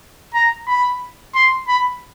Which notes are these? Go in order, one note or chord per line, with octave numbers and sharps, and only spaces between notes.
A#5
B5
C6
B5